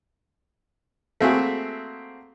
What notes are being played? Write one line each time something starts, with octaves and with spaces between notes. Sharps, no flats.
A3 A#3 C4 F#4 G#4 E5